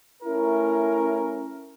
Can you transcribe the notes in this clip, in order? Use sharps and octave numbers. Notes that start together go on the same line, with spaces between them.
A3 C#4 E4 A#4